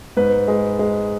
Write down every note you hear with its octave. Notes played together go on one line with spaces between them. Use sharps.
G#2 B4
G#3
G#3